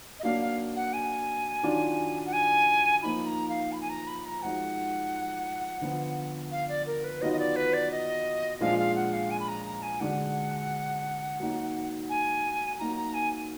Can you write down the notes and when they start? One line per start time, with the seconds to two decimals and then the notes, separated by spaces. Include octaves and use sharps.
0.20 D#5
0.23 F#3 A#3 D4 F5
0.41 F5
0.76 F#5
0.93 G#5
1.63 D#3 F#3 D4 F4
2.26 F#5
2.33 G#5
3.03 F3 A#3 D#4 B5
3.26 A#5
3.49 F5
3.72 B5
3.81 G#5
3.89 A#5
4.07 B5
4.25 A#5
4.42 F3 G#3 D#4 F#4 F#5
5.81 D3 F3 B3
6.51 F5
6.69 D5
6.86 A#4
7.04 B4
7.21 D#3 F#3 B3 F4 D#5
7.33 D#5
7.39 D5
7.56 B4
7.73 D5
7.91 D#5
8.60 A#2 F3 G#3 D4 F4 F5
8.79 F5
8.95 F#5
9.13 F5
9.30 G#5
9.40 B5
9.48 A#5
9.66 A#5
9.83 G#5
10.00 D3 G#3 D4 F#4 F#5
11.40 F#3 A#3 D#4 F#4
12.09 G#5
12.79 F#3 A#3 D#4 F#4 A#5
12.96 A#5
13.14 G#5